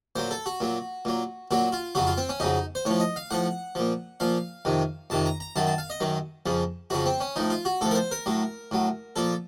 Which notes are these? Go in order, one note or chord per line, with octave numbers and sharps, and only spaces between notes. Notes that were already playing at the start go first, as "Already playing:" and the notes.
A#2 F#3 C5
A4
F#4
A#2 F#3
A#2 F#3
A#2 F#3 F#4
F4
F2 C#3 F#3 F#4
F4
C4
C#4
F2 C#3 F#3 D#4
C5
A2 F3 C#5
D#5
F5
A2 F3 F#5
A#2 F3
A#2 F3 F5
F2 C3 D#3
F2 C3 D#3 A5
A#5
A#5
F#2 D#3 F#3 A5
A5
F5
D#5
F#2 D#3 F#3
F2 C#3 F3
F2 C#3 F3 F#4
C4
C#4
A2 F3 D#4
F4
F#4
A2 F3 A4
A#4
C5
A#4
A2 F#3
A2 F#3
A#2 F3 A4